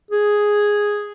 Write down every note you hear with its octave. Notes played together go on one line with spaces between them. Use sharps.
G#4